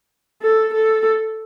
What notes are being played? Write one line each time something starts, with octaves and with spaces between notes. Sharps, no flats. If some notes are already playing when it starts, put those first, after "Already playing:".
A4
A4